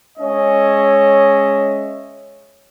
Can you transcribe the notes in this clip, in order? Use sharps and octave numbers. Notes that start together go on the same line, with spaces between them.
G#3 C#4 C#5 D#5 E5